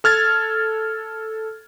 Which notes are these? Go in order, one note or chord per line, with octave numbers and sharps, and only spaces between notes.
A4 F6 G#6 A6